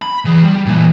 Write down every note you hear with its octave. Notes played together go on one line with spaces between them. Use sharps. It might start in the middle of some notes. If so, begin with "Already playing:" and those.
B5
E3 G#4
G3
A#2 E3